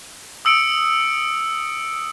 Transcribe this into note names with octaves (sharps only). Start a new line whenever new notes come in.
D#6 E6 C#7 D7